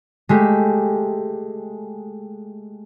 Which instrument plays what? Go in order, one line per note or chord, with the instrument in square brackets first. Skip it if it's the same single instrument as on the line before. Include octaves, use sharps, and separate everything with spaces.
[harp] G#3 A3 G4